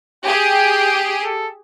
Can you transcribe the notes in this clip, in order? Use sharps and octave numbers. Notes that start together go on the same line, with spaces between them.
G4 G#4 G5
A4